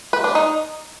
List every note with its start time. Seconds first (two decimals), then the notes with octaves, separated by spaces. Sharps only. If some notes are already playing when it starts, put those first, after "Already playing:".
0.13 B4
0.24 D4
0.35 D#4